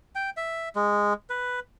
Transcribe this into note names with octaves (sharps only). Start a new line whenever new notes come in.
G5
E5
G#3
B4